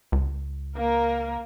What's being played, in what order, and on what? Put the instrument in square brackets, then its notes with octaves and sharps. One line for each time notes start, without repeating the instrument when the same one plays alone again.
[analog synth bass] C#2
[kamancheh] A#3 A#4